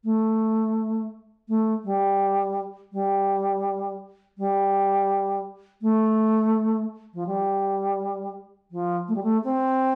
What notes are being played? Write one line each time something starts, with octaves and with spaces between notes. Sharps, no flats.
A3
A3
G3
G3
G3
A3
F3
G3
F3
A3
G3
A3
C4